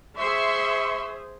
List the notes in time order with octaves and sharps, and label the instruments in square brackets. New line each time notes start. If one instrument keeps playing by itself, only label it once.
[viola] G#4 C5 [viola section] E5 C6 [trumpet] C#6